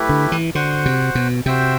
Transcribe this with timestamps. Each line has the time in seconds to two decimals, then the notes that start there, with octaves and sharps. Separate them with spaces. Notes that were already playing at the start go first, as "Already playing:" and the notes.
Already playing: A3 E4 G4 B4
0.09 D3
0.32 E3
0.55 D3 F#4 C5 F#5
0.86 C3
1.15 B2
1.46 C3 F#4 C5 E5 G5